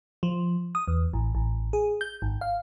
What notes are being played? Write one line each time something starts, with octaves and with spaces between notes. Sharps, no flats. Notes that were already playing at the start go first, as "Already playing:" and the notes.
F3
D#6
E2
A1
A1
G#4
G6
G#1
F5